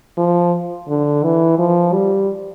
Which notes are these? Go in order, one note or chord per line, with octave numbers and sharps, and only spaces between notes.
F3
D3
E3
F3
G3